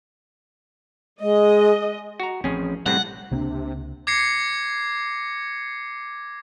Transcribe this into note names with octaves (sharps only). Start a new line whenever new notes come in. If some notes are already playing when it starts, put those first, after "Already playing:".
G#3 D#5
F#4 A#5
A1 F3 C4 C#4 G#4
A2 C3 G3 C4 F#5
C#2 C3 A#3 C4 D4
D6 G#6 A#6 C7 C#7